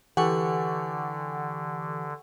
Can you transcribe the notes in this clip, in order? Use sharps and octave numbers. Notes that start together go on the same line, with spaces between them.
D3 E3 G4 A4 B4 F#5 G#5 C#6